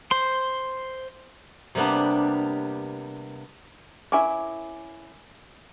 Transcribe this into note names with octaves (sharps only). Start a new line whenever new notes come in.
C5 C6
C3 G3 A#3 B3 D4
C#4 E4 A#4 E5 G#5 D6